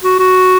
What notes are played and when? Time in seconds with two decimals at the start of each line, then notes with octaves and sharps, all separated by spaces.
0.04 F#4
0.19 F#4